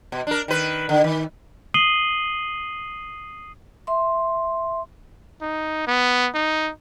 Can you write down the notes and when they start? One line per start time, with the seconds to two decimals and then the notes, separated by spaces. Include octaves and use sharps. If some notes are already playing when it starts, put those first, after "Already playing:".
0.12 B2
0.27 D4 A#4
0.48 D#3 B4
0.89 D3
1.04 D#3
1.74 D#6 C7 D#7 F#7 G7
3.87 E5 C6
5.41 D#4
5.87 B3
6.34 D#4